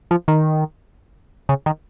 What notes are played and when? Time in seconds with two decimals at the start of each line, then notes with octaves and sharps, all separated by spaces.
0.11 F3
0.28 D#3
1.49 C#3
1.66 D#3